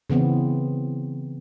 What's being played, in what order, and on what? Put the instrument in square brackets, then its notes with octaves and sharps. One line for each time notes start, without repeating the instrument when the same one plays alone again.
[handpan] C#3 E3 B3 C4